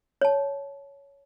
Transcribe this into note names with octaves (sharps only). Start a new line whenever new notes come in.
C#5 A5